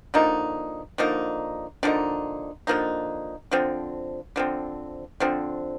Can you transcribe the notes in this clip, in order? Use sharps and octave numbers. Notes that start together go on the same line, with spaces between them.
D3 F3 A#3 D#4
D3 F3 A#3 D#4
D3 F3 A#3 D#4
D3 F3 A#3 D#4
D3 F3 C4
D3 F3 C4
D3 F3 C4